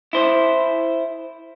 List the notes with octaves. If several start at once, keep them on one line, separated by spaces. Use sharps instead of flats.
E4 C5